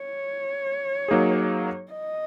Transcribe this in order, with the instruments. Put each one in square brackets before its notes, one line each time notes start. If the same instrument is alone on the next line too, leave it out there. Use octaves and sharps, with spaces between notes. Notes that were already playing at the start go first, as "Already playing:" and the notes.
Already playing: [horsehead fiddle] C#5
[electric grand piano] F#3 A#3 D#4 G#4
[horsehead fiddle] D#5